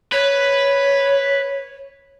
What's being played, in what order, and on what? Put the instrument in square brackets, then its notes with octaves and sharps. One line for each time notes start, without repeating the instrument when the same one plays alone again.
[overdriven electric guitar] B4 [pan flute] C#5